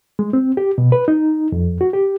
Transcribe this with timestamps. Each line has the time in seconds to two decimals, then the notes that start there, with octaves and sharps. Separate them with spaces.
0.19 G#3
0.33 C4
0.57 G4
0.78 B2
0.92 B4
1.08 D#4
1.52 F2
1.81 F#4
1.94 G4